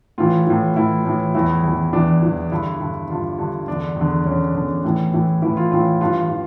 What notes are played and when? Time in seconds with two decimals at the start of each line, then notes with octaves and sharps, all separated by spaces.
0.18 A2 E3 F4
0.47 A2 E3
0.76 A2 E3 E4
1.05 A2 E3
1.35 E2 E3 E4
1.64 E2 E3
1.93 E2 E3 D4
2.23 E2 E3
2.52 G2 D3 E4
2.80 G2 D3
3.09 G2 D3 F4
3.38 G2 D3
3.67 E2 D3 D4
3.96 E2 D3
4.26 E2 D3 C#4
4.55 E2 D3
4.84 A2 E3
5.13 A2 E3
5.42 A2 E3 E4
5.57 F4
5.71 A2 E3 F4
6.01 G2 E3 F4
6.30 E3